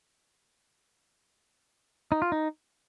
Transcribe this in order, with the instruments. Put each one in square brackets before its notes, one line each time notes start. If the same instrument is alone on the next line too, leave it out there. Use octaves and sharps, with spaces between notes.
[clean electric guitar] D#4
F4
D#4